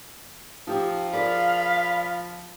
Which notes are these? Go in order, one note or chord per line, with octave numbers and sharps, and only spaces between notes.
F3 D#4 G4 E5
G#4 A#4 D5 F5 B5